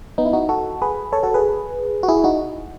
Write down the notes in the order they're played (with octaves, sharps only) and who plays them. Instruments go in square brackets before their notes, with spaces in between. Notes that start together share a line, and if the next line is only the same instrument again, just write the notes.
[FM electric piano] B3 D#4
E4
D#4 F#4
F#4 A4
G#4 B4
A4 C#5
F#4 A4
G#4 B4
F#4
E4 G#4
D#4 F#4